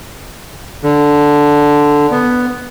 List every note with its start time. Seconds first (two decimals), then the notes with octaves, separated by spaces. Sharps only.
0.83 D3
2.11 B3